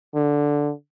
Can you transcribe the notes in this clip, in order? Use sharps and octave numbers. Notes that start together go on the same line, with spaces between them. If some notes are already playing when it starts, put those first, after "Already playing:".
D3